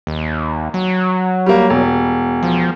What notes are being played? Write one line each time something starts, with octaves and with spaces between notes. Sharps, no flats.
D#2
F#3
G3 A#3
E1
F3